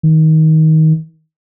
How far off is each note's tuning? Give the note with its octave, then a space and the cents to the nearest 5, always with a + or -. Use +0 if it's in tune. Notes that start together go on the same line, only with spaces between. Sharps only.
D#3 +20